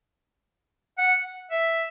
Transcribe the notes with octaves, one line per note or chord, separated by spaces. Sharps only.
F#5
E5